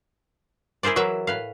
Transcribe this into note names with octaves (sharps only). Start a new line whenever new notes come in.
E4 G#4 A#4 C5 D5
E3 F#3 A#4 B4 E5
A2 B4 F5